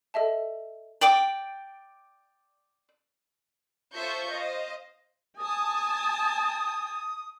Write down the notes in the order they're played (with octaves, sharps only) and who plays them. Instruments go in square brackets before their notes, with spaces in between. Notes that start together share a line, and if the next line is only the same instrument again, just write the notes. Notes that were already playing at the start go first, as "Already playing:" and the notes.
[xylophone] A4 D#5 E5 A5
[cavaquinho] D5 G5 D6
[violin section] F4 A4 C5 E5 C#6 G6
C5 D#5 F5
[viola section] G#5 A5 [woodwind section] D#6